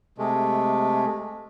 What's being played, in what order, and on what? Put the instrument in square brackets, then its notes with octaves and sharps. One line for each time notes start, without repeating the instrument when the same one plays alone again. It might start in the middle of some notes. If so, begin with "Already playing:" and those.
[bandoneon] C3 G#3 A3